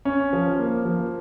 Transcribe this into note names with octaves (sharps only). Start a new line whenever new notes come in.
C#4
F3
A#3
F3